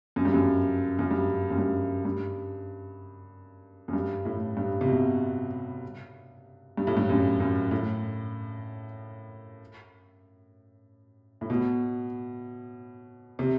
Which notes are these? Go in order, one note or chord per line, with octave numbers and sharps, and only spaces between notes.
F#2
G2
F#2
F#2
G2
F#2
G2
G2
F#2
G2
A2
G2
C3
B2
G2
A2
G2
F#2
F#2
A2
A2
B2
C3